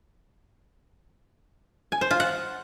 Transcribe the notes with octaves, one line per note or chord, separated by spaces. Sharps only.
G#5
C5
F4
F#5